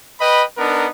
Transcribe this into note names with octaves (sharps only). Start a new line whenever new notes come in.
B4 D#5 G5 B5
B3 D4 D#4 A#4